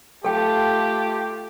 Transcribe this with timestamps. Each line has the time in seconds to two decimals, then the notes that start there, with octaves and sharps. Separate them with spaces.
0.24 A3 F4 G4 A4 G5